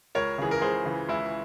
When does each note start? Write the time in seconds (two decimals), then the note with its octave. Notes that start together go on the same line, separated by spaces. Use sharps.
0.15 C#2 A#4 C#5
0.38 C#3 E3 G#4
0.51 A#4
0.61 C#2 G#4 C5
0.85 C#3 E3
1.09 C#2 E4